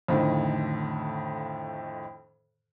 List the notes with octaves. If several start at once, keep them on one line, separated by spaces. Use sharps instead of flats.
F2 A2 D3 D#3 F3